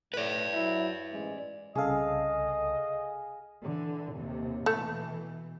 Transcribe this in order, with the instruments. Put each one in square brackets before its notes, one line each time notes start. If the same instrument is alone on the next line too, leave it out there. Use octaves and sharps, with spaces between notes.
[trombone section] A2 [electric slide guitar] B4 D5
[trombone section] F#3 E4
A1 G#2 G#3
[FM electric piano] C2 C#3 A4 [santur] G#4 F5 [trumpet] D#5
[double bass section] D3 E3
D#2 C3
[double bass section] B2 E3 [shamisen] A3